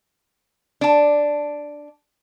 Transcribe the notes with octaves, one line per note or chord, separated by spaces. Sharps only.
D4 A5